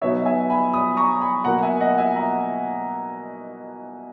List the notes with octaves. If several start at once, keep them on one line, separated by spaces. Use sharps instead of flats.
B2 F#3 B3 D#4 C#5 E5
E5 G#5
G#5 B5
B5 D#6
A#5 C#6
G#5 B5
B2 F#3 A#3 F#5 A#5
E5 G#5
D#5 F#5
E5 G#5
F#5 A#5